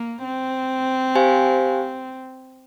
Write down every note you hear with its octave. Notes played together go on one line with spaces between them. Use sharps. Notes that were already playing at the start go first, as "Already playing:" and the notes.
Already playing: A#3
C4
G4 C5 F5 G#5